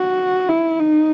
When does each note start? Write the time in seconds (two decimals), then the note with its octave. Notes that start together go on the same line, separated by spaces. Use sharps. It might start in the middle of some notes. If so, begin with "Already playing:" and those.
Already playing: F#4
0.48 E4
0.80 D#4